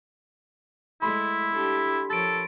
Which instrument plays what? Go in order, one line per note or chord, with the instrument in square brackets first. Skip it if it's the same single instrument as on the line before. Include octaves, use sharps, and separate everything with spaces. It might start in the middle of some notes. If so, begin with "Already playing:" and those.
[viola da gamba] G#3 A3 A4 [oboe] E4 [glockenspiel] B5 C6 B6
[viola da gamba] D4 G4 A4
[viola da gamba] F3 A#4 C#5 [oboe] A4 [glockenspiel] A6 D7